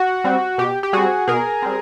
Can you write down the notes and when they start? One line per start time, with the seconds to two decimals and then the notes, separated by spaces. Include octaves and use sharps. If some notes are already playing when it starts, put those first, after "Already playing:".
Already playing: F#4
0.24 G3 C4
0.58 B2 G4
0.83 G4
0.93 G3 C4 F#4 G#4
1.28 B2 G#4 A#4
1.62 G3 C4